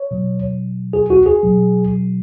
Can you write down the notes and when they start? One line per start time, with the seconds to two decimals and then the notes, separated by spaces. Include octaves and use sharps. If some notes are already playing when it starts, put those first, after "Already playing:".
Already playing: C#5
0.11 B2 F#3
0.93 G#4
1.10 F#4
1.26 G#4
1.43 B2 F#3